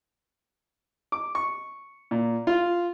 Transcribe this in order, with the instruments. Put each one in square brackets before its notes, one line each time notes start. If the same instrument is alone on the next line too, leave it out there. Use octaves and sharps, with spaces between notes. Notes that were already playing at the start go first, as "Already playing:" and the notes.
[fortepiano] D6
C#6
A#2
F4